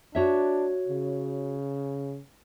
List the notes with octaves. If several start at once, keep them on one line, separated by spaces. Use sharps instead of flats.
D4 F#4 C#5 E5
C#3